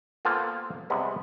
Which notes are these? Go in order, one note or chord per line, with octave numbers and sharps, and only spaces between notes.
A#3 B3 F4 A4 C5
C3 G3 G#3 B3